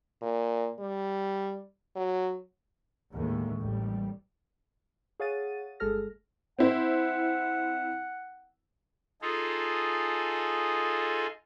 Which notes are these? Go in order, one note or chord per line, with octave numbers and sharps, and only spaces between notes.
A#2
G3
F#3
D#2 A2 D3 G#3
A1 D#2 G3
G#4 C#5 F5 F#5 A6 D#7
G1 G#3 G#4 A4 F6 A#6
C4 E4 C5 F#5
D#4 F4 G#4 A4